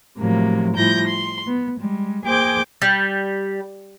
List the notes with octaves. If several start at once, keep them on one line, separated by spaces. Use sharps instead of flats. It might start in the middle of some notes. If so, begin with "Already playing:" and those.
A2 C3 F3 F#3 A#3
A2 F3 G3 E4 G6 A#6
C6
B3
G3 G#3
A#3 G#4 C5 G5 D6 G6
G3